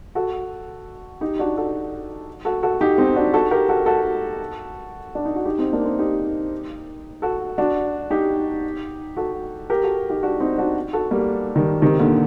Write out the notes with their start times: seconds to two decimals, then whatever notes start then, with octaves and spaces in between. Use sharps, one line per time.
0.15 F#4 A4
1.21 D#4 G4
1.39 D4 F#4
1.57 F#4 A4
2.45 F#4 A4
2.63 F#4 A4
2.81 D#4 G4
2.98 C4 D#4
3.16 D4 F#4
3.33 F#4 A4
3.51 G4 A#4
3.69 F#4 A4
3.86 F#4 A4
5.15 D4
5.25 D#4
5.36 F#4
5.45 D#4 G4
5.59 C4 D#4
5.73 A#3 D4
5.85 C4 D#4
5.99 D#4 G4
7.22 F#4 A4
7.58 D4 F#4
8.10 D#4 G4
9.17 F#4 A4
9.70 G4 A#4
9.83 F#4 A4
10.10 D#4 G4
10.23 D4 F#4
10.40 C4 D#4
10.58 D4 F#4
10.93 F#4 A4
11.11 G3 A#3
11.55 D#3 G3
11.82 C3 D#3
11.99 A#2 D3